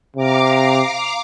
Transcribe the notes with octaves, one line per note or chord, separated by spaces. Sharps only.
C3 F5 A#5 D6